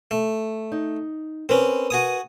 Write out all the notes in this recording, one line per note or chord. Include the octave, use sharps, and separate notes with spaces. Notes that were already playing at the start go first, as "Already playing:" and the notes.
A3
D#4
C4 C#4 A#4 B4
F#4 G#5 D#6